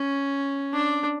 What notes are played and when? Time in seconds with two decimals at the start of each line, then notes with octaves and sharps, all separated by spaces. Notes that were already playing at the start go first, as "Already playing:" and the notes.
Already playing: C#4
0.73 D4